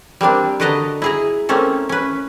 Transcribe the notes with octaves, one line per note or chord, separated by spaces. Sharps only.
G3 A#3 C4 D4
D3 F#4 B4 D#5 A5 A#5
E4 G#4 A#5
A3 A#3 C4 C#4 A4
C#4 B4